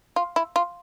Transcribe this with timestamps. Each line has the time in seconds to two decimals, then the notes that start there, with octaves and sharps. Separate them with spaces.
0.16 F4
0.36 E4
0.56 F4